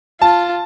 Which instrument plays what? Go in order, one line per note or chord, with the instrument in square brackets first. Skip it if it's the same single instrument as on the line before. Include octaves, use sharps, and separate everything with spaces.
[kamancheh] F4 [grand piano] A5